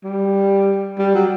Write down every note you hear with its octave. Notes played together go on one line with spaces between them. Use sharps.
G3
G3
F#3